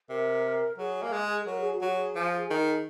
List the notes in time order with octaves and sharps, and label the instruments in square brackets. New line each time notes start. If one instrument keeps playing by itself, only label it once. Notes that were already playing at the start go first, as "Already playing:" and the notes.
[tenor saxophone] C3 [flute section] A#4
[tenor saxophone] F#3 [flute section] G#4
[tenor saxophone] A#3
G#3
[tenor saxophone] F#3 [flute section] A#4
[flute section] G#4
F#4
[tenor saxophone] F#3 [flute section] G#4
[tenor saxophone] F3
D#3